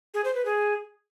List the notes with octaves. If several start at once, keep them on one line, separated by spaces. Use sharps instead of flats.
G#4
C5
B4
G#4